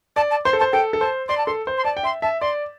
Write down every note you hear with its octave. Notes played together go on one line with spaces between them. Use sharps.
D5 A5
A5
C5 C6
A4
C5 A5
A4 G5
A4
C5 A5
D5 C6
A5
A4 C6
C5
C6
D5 A5
G5
E5 C6
E5 A5
D5 C6